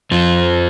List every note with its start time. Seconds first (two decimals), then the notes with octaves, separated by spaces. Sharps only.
0.11 F2 F3